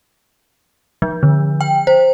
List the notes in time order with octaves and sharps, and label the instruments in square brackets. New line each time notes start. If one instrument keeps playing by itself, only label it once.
[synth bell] F3
D3
G5
C5